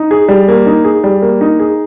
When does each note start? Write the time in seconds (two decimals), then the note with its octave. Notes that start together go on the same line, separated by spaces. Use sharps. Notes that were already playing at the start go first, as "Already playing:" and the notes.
Already playing: D#4
0.11 G#4
0.29 G3
0.48 A#3
0.66 D#4
0.85 G#4
1.04 G3
1.22 A#3
1.41 D#4
1.60 G#4